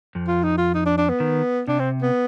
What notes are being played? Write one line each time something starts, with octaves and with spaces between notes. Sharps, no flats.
F2 F3
F4
D#4
F4
D#4
D4
D4
B3
D#3
C3 D4
C4
B3